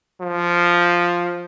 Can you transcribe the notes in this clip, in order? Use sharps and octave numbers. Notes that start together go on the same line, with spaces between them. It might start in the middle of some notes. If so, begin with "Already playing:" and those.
F3